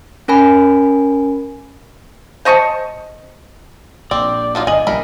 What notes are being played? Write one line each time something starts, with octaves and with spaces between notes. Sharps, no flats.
C#4 A#4 G#5 B5
C5 D#5 A5 C#6
A#1 C4 D5
F#3 D#4 F4
G1 D#5 G#5 F#7
A#1 D#2 E3 G3 A#4 B5